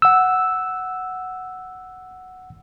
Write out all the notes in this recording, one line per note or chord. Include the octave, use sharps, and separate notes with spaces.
F#5 E6